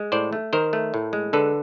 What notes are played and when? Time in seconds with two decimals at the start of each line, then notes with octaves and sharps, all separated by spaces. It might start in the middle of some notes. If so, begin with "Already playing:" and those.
Already playing: G#3
0.12 A2 C5 D5
0.33 A3
0.53 D#3 A#4 C5
0.73 A3
0.94 A2
1.13 G#3
1.33 D3 A4 B4